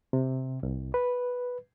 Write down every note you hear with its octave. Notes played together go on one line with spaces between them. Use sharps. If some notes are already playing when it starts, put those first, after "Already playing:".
C3
C2
B4